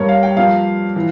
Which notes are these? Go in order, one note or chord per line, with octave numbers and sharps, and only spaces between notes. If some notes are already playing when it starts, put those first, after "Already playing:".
Already playing: G2 G3 A#3 A#4 C#5
F5
G5
G2 F3 A#3 F5
E3